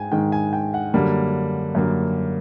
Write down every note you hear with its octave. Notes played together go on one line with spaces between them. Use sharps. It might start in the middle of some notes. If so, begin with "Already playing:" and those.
Already playing: G#2 G#3 G5 G#5
G#2 D#3 G#3 G5
G#5
G5
F#5
F#2 D3 G3 A#3
F#2 D3 G3 A#3